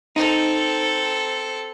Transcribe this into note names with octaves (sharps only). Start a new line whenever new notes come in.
C4 D#4 A4